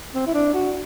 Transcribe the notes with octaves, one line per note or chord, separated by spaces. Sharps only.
C4
E4
D4
F#4